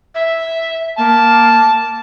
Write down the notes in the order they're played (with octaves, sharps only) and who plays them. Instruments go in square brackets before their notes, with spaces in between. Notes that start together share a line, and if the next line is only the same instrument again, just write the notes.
[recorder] E5
[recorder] A#3 [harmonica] A5